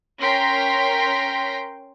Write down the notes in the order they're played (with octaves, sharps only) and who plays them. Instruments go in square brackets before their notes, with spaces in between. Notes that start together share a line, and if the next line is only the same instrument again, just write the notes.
[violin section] C#4 A#4 G5 C6 A#6 B6